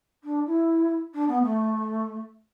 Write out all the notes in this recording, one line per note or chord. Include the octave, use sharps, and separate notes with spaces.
D4
E4
D4
B3
A3